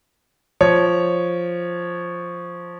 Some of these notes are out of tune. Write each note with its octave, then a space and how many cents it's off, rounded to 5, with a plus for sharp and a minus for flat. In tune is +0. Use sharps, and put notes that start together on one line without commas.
F3 +0 C#5 +0